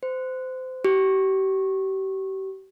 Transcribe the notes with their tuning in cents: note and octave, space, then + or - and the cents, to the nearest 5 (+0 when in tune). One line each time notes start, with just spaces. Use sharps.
C5 -25
G4 -35